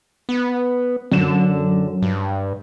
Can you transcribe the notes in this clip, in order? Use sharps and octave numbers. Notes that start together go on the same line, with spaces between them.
B3
F#2 D3 E7
G2